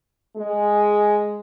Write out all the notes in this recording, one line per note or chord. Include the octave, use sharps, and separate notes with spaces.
G#3